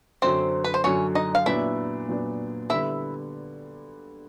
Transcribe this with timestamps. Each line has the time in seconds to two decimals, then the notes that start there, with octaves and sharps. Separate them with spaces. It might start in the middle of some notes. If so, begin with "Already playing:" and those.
0.22 F#2 D3 F#3 C4 C5
0.64 B4
0.74 C5
0.84 F#2 D3 F#3 C#4 C#5
1.15 D#4 D#5
1.35 F5
1.46 A#2 F#3 B3 D4 E4 E5
2.08 A#2 F#3 B3 D4
2.70 D3 G3 B3 E4 E5